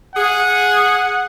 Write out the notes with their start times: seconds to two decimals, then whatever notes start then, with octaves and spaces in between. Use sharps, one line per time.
0.16 G#4 F#5